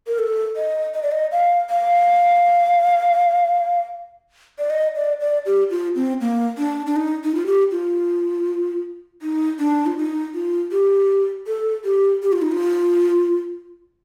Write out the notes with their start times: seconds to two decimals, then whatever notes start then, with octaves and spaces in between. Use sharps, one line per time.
0.07 A#4
0.19 A4
0.56 D#5
0.94 D#5
1.03 D5
1.12 D#5
1.32 F5
1.70 F5
4.59 D5
4.70 D#5
4.96 D5
5.21 D5
5.46 G4
5.71 F4
5.96 C4
6.21 A#3
6.58 D4
6.86 D4
6.96 D#4
7.24 D#4
7.35 F4
7.46 G4
7.71 F4
9.22 D#4
9.59 D4
9.86 F4
9.97 D#4
10.35 F4
10.72 G4
11.47 A4
11.85 G4
12.23 G4
12.32 F4
12.42 D#4
12.52 F4